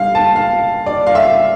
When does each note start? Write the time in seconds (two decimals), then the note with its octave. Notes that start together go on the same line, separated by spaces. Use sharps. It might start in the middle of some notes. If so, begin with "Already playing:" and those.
Already playing: G3 F5
0.15 A5
0.36 F5
0.86 D5
1.07 F5
1.15 E5